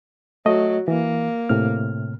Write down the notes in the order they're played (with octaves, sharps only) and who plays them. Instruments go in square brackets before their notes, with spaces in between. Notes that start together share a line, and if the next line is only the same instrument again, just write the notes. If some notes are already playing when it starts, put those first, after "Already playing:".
[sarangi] F#3 [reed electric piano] A3 D#5
[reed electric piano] E3 [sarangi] A#3
[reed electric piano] A2 C3 F6